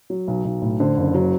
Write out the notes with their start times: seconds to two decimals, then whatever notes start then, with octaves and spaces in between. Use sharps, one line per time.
0.10 F#3
0.28 B1
0.45 B1
0.62 A2
0.80 D3 C5
0.97 F#1
1.14 F#3